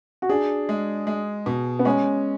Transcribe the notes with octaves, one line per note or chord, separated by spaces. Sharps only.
F#4
D4 G#4
G#3
G#3
B2
B3
G#3 C#4